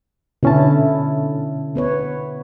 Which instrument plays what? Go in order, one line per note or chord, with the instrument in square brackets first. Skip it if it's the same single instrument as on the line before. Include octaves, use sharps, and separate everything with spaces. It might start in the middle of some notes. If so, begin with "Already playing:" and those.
[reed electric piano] B2 C#4 A5 [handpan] D3 E4
[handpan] B3 B4 C#5